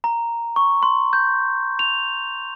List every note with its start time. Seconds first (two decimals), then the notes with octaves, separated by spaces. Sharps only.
0.04 A#5
0.56 C#6
0.83 C6
1.13 G6
1.79 F7